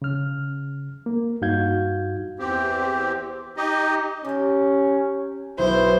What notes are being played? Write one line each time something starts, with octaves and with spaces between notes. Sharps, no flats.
C#3 F6
A#3
G2 D#4 F#4 F5 G6 G#6
E2 C4 G4
D#4 G4 D#5
C3 C#4 G4
B1 E4 C5